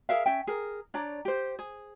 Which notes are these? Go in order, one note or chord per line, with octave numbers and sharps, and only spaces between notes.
G#4 A#4 E5 F5
C#4 E5 G5
G#4 A#4
D4 C#5 D5 A#5
G4 C5
G#4